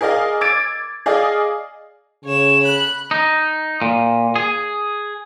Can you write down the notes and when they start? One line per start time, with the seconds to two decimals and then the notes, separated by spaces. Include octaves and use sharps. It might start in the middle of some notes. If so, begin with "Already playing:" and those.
0.01 G#4 A#4 D5 D#5 F5
0.41 D6 E6 G#6 A6 D7
1.06 G#4 D5 D#5 F5
2.25 C#3 C#5 E7
2.63 B5 F#6
3.11 D#4
3.82 A#2
4.36 G#4